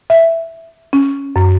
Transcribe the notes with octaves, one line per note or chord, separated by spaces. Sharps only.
E5
C#4
F#2